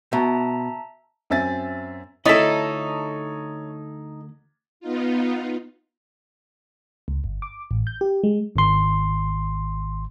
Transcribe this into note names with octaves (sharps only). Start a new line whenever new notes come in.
B2 E5 A5 A#5
F#2 C4 E5 G#5 A6
D2 D#4 E4 A4 C#5 D#5 A6 B6
B3 D#4 F4
C#2
G1
D6
A1
G6
G4
G#3
G#1 C6